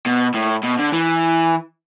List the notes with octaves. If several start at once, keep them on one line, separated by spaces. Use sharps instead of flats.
B2
A2
B2
D3
E3